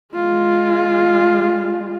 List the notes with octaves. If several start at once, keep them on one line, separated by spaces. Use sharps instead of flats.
G#3 F4